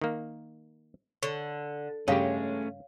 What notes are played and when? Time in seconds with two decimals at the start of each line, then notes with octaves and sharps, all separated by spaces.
0.02 D#3 A#3
1.23 D3 C#5
2.08 G2 C#3 G#3 A3 C#4 G4 C#5 F5